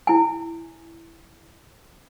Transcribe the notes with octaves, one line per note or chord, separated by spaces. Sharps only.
E4 G#5